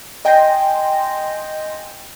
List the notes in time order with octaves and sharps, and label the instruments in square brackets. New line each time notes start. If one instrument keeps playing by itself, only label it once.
[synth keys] D#5 G5 G#5 C6 G6 A#6